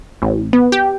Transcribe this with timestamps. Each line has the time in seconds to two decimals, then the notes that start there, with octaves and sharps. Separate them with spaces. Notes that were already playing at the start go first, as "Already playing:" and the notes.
0.22 A1
0.53 B3
0.72 G4